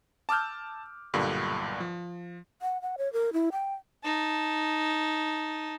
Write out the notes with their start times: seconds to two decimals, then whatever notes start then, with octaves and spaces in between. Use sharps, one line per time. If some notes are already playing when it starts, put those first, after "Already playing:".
0.29 A5 D6 E6 F6 G6
1.14 B1 G2 A#2 D3 G3
1.80 F3
2.62 F#5
2.82 F#5
2.98 C#5
3.13 A#4
3.33 E4
3.52 G5
4.04 D#4 A5